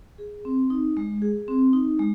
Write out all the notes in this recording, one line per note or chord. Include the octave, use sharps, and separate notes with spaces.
G#4
C4
D#4
G#3
G#4
C4
D#4
G#3